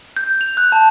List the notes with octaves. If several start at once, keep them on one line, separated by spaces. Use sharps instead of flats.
G6
F7
F#6
A5